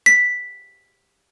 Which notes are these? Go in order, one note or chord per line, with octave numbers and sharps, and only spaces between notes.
B6